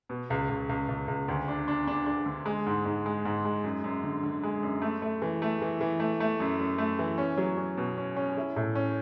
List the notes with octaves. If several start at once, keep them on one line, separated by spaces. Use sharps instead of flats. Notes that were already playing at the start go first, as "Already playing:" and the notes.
B2
C#2
C#2
C#2
C#2
C#2
D2
D4
D4
D4
D4
D3
G#3
G#2
G#2
G#3
G#2
G#3
F#2
F#2
D3
D3
G#3
F#2
A3
A3
E3
A3
E3
E3
A3
A3
F#2
F#2
A3
E3
C#4
F#3
C#4
B2
C#4
C#4
E4
A2
C#4